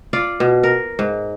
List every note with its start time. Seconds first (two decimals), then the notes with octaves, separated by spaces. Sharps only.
0.13 F4 D5
0.40 B2
0.63 A#4
0.99 G#2